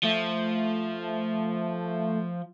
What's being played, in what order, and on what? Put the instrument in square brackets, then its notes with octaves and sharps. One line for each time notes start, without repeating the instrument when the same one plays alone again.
[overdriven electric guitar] F3 [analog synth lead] A3